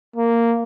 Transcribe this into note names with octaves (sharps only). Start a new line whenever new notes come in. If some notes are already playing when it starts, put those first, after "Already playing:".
A#3